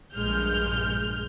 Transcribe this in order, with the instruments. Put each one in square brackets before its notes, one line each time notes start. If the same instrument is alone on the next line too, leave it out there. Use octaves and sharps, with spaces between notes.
[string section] A#1 G2 G#3 F6 G6